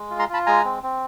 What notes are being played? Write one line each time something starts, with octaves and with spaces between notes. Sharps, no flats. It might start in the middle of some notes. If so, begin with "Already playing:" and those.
Already playing: G#3
F4
A#5 C6
F4 A5 B5
G#3 G#5 A#5
C4
C4